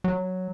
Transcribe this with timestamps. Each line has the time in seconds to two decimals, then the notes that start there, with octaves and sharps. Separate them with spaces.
0.04 F#3